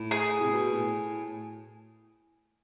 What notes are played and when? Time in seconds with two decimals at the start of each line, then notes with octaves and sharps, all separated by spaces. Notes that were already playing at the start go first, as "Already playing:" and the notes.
Already playing: A2
0.11 G#4
0.41 C3
0.52 B2
0.73 A2